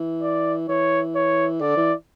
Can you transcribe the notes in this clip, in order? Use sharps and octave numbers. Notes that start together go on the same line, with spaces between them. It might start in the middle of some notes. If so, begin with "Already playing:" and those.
Already playing: E3
D5
E3 C#5
C#5
D3 D5
E3